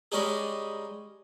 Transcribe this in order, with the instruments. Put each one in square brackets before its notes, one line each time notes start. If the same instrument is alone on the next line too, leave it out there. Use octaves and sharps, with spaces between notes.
[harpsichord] G3 G#3 C#4 D#4 G#4